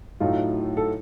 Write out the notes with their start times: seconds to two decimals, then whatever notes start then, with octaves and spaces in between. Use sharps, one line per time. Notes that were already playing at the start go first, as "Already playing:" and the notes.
0.20 A2 F#3 A3 D#4 F4
0.77 A4